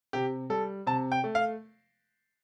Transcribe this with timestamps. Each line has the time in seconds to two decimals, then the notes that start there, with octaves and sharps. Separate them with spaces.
0.13 C3 G4
0.50 G3 A4
0.87 C3 A5
1.12 G5
1.24 A3
1.35 F5